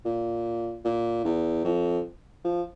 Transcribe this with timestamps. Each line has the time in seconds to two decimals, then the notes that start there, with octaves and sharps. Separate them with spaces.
0.05 A#2
0.84 A#2
1.25 E2
1.64 F2
2.44 F3